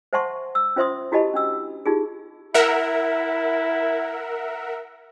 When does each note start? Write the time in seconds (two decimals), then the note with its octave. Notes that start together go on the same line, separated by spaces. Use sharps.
0.13 C5 E5 F#5 A5 C6 C#6
0.55 E6
0.76 C#4 F4 C5 E5 C6 D#6
1.12 E4 F#4 G4 D#5 A5 B5
1.34 C#4 D4 E6
1.86 D#4 F4 G4 G#4
2.54 E4 A#4 E5 F#5